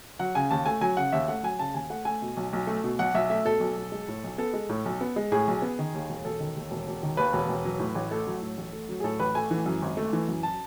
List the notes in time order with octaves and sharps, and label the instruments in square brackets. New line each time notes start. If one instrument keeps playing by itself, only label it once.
[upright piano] F#3 F#5
C#3 G#5
D#2 A5
A3 G#5
F#3 G#5
C#3 F#5
D#2 E5
A3 F#5
F#3 G#5
C#3 A5
D#2 G#5
A3 F#5
A3 G#5
B2
B1
B1
A3
B2
B1 F#5
B1 E5
A3 E5
B2 A4
B1
B1
G#3
A2
B1
B3 A4
G#3
A2
B1
B3
G#3
A2 G#4
B1
B3
D#3
D#2
E1
E1 A4
D#3
D#2
E1
E1
D#3
D#2 B4
E1
E1
F#3
A2
A1
A3 A4
F#3
A2
A1
A3
F#3
G#4
A2 A4
A1 B4
A3 G#5
E3
F#2
G#1
A3
E3
F#2
A5